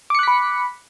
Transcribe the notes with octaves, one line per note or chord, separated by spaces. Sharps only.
B5 D6 F#6 B6 C#7